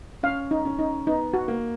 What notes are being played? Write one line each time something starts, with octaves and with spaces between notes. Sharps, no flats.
C#4 F5
D#4
C#4
D#4
B3 D#4
F#4
A#3